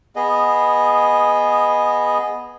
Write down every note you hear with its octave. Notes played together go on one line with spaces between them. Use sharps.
B3 G#4 D#5